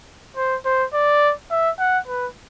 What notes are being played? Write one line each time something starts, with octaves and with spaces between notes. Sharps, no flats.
C5
C5
D5
E5
F#5
B4